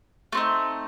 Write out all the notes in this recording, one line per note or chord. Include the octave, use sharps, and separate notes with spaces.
A3 C4 D#4